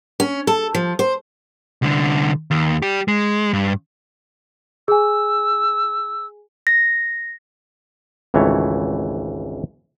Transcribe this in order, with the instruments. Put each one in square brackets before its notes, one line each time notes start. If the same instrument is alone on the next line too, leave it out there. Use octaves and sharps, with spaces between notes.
[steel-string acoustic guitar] C#4
A4
F3
C5
[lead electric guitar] C2 D3
D#2
G3 G4
G#3
G2
[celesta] G#4 G#5 [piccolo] E6
[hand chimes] A#6
[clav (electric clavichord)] G#1 C#2 E3 A3 C#5